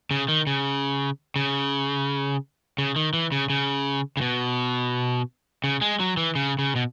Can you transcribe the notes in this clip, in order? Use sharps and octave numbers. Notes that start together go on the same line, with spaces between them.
C#3
D#3
C#3
C#3
C#3
D#3
E3
C#3
C#3
C#3
B2
C#3
G#3
F#3
E3
C#3
C#3
B2